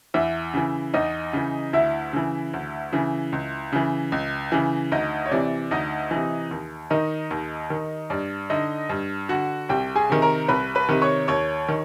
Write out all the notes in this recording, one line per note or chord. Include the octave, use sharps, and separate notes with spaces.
E2 E4 E5
C#3 E3
E2 D#4 D#5
C#3 E3
D2 E4 E5
C#3 E3
D2
C#3 E3
C#2
C#3 E3
C#2
C#3 E3
D2 D#4 D#5
C#5
C3 E3 D5
D2 D#4 D#5
C3 E3
D#2
D#3 D#4 D#5
D#2
D#3
G2 D5
D3 D#4 D#5
G2
D3 F#4 F#5
C2 G4 G5
G#4 G#5
C3 D#3
A#4 A#5
C2 B4 B5
B4 B5
C3 D#3
C#5 C#6
D#2 C#5 C#6
D#3